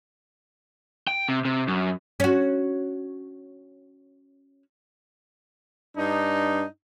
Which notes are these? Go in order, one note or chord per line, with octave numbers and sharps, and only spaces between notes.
G5
C3
C3
F#2
C#4 F#4
G2 D4 D#4